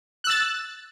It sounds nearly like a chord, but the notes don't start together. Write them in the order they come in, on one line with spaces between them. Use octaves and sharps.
F#6 E6 A6